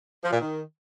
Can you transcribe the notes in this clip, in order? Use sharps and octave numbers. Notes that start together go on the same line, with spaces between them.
F3
A#2
D#3